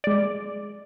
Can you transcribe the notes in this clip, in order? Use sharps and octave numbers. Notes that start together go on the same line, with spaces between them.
G#3 D5